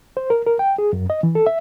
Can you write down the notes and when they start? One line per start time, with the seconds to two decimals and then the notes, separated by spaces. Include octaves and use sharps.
0.17 C5
0.30 A#4
0.47 A#4
0.59 G5
0.78 G#4
0.93 F#2
1.10 D#5
1.23 E3
1.35 A4
1.46 E5